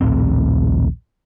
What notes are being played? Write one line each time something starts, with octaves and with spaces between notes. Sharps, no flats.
A#1 D#2 A2 C4